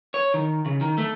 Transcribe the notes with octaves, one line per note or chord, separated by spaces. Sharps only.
C#5
D#3
C#3
D#3
A3